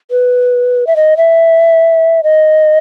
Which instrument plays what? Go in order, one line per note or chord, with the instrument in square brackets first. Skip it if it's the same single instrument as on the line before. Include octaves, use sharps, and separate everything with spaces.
[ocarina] B4
E5
D#5
E5
D#5